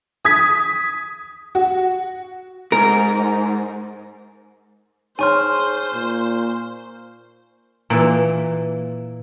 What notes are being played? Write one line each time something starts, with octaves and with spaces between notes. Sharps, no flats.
D#6 G#6 B6
F#4
G#2 A#4
D#4 G#4 C5 C#5 G#5 C6 C#6 F6
A#2
A#2 E3